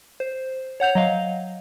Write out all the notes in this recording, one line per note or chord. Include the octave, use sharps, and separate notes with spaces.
C5
C#5 F#5 G6 F7
F#3 D#5 F5